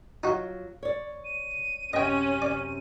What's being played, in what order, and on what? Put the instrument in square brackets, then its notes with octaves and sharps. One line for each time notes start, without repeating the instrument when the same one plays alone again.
[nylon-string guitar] F#3 F4 [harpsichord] D#4 F#4
[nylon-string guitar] C#5 D5
[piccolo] D#7
[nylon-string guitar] F#2 C3 G#5 [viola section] C#4 [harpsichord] D#5 G5
[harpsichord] D5